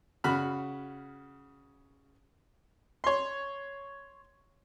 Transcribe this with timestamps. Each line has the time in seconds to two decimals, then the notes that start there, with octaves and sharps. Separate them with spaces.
0.24 C#3 F#4 B5 F6
3.04 C#5 C6